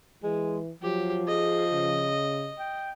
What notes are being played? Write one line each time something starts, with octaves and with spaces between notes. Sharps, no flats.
E3 G#3
F3 F#3 G4
G#4 D#5
C#3
G5